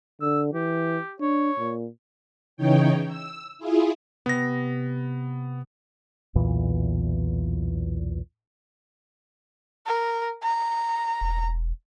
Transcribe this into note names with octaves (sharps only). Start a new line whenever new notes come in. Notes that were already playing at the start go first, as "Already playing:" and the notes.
D3 E6
E3 G4
D4 C#5
A#2
C#3 E3 D#4 C#5 G5
E6
E4 F4 G#4
C3 B3 A#6
B1 E2 A#2 E3
A#4
A#5
E1